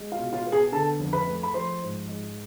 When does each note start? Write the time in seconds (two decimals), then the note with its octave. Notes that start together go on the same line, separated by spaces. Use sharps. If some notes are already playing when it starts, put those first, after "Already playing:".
Already playing: G#3
0.12 F4 F5
0.18 B2
0.33 F4 F5
0.46 B3
0.52 G#4 G#5
0.72 D3 A4 A5
1.00 F2
1.13 B4 B5
1.27 A3
1.43 B5
1.54 F3 C5 C6
1.82 G#2
2.08 G#3